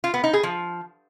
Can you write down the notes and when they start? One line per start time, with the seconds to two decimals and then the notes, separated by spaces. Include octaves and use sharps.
0.04 F4
0.14 B3
0.24 D#4
0.33 G#4
0.43 F3